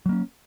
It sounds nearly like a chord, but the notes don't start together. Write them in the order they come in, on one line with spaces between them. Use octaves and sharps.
F#3 A#3 C#4